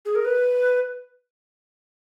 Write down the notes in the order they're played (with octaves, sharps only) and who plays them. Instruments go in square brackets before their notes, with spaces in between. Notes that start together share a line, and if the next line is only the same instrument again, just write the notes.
[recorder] G#4
A#4
B4